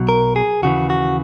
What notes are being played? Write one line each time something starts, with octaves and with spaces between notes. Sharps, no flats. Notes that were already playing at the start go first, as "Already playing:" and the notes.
Already playing: B1 B2 F#3
A#4
G#4
D#2 C#3 E3 F#4
F#4